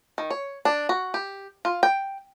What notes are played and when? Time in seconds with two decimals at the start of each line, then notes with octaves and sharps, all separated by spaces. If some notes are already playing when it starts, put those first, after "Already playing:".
0.18 D#3
0.30 C#5
0.65 D4
0.89 F#4
1.14 G4
1.65 F4
1.83 G5